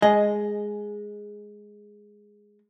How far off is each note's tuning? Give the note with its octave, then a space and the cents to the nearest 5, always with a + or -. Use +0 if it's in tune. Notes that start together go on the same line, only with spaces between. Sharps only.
G#3 +0 D#5 +0 G#5 +15